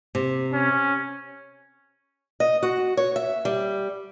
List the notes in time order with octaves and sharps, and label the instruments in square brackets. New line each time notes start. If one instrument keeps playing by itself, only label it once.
[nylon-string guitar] C3
[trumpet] C#4
[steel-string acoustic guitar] D#5
F#4
C#5
E5
G3